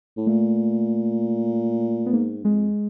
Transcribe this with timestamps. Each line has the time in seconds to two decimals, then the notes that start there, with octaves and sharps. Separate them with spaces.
0.17 A2
0.27 A#2 A3
2.06 B3
2.13 G#2 A#3
2.44 F2 G#3